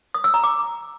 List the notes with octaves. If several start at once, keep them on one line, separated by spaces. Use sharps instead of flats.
D#6
E6
A#5
D6